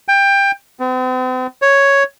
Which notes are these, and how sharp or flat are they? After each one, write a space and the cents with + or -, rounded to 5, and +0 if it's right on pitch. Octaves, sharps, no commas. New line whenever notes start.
G5 +20
C4 -45
C#5 +0